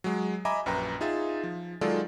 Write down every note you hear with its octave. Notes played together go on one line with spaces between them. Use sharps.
F#3 G#3
D#5 E5 G#5 A#5 B5 D6
A#1 F#2 B4 G5 A#5
D#4 F4 G#4 E5 A6
F3
D#3 F#3 G#3 F4 A4 D5